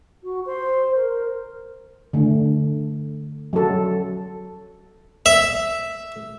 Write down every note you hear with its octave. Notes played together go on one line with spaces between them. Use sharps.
F#4
C5
A#4
D3 A3
F#3 A4
E5